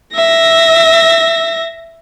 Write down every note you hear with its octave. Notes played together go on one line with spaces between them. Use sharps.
E5 A#6